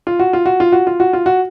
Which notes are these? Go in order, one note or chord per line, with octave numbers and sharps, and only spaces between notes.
F4
F#4
F4
F#4
F4
F#4
F4
F#4
F4
F#4